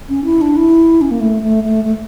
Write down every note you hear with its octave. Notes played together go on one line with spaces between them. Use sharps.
C#4
E4
D4
E4
C#4
A#3
A3
A3
A3
A3